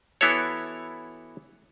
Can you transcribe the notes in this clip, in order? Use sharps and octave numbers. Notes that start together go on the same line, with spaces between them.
E3 B3 E4 F#4 A4 C#5